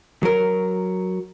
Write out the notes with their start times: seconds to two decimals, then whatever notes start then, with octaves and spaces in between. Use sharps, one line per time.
0.23 F#3 A#4